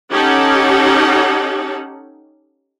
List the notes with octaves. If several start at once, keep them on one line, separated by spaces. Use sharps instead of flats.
C#4 D#4 G4 A4 F#5